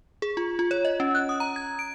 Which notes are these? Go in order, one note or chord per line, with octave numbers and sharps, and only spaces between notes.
G#4
F4
F4
C#5
D#5
C#4
F#6
D#6
A#5
G#6
D7